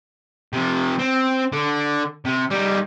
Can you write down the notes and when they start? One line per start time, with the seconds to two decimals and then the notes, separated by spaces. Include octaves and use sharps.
0.53 C3 F3
0.99 C4
1.53 D3
2.25 C3
2.51 G3 D#4